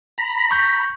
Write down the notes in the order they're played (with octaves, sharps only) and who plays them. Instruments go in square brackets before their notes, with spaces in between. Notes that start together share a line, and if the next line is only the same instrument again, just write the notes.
[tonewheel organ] A#5 B5
[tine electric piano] C#6 G6